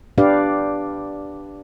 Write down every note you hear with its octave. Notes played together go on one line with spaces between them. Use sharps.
D4 G4 B4 D5 F5